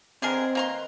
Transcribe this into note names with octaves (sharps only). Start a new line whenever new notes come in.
D3 D#3 C4 G#4 A#4 B4
A#3 A#5 C6